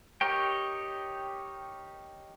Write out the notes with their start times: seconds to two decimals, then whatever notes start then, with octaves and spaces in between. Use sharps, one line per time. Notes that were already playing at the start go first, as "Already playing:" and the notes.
0.21 D#4 G4 A#4 C#5 G5